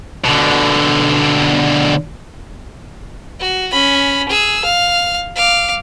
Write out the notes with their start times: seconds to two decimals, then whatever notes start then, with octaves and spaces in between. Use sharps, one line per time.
0.25 B2 D3
3.40 F#4
3.71 C#4 B5
4.29 G#4 E6
4.65 F5
5.36 F5 D6